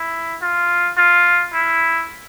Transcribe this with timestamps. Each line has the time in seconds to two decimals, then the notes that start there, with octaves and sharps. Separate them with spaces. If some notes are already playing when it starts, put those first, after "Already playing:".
Already playing: E4
0.42 F4
0.97 F4
1.53 E4